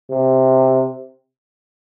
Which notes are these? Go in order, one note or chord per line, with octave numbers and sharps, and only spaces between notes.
C3